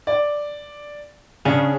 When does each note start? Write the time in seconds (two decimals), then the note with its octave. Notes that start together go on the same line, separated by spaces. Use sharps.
0.07 D5
1.45 C#3 C#4 D4 G#4